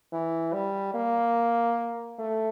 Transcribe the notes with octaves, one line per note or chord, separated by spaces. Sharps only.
E3
G3
A#3
A3